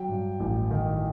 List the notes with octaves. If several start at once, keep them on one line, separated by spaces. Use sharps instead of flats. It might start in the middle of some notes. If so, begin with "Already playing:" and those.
Already playing: F#3 G5
G2
A1
D#3